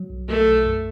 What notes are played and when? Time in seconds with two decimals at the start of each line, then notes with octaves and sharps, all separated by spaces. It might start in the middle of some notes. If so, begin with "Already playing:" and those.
Already playing: F#3
0.10 B1
0.28 B1 A3
0.47 B1
0.65 F#2